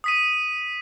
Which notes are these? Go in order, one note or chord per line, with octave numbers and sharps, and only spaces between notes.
D#6 B6 D#7